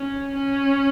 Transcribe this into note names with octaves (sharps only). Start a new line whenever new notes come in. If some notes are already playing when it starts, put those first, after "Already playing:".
Already playing: C#4
C#4